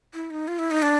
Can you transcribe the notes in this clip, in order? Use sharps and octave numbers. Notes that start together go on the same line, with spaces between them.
E4
D#4
F4
E4
D#4
D4